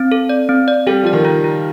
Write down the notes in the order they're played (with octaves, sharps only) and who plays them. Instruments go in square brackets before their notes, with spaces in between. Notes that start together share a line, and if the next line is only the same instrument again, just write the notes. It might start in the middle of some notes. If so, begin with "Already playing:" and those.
Already playing: [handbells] C4
A4
D5
C4
D5
[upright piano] G3 [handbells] A4
[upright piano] F3 [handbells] D5
[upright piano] D#3
[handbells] F4
F4